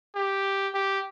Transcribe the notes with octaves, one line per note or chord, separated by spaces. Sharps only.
G4
G4